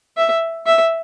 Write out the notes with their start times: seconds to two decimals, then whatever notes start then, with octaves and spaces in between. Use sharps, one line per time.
0.17 E5
0.66 E5